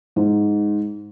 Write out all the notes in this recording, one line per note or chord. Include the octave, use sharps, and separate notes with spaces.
G#2